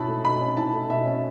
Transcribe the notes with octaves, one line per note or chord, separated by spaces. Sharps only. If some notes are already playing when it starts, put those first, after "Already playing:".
Already playing: B2 C#4 E4 A5 B5
A3
B2 B5
C#4
E4 A5
A3
B2 E5
C#4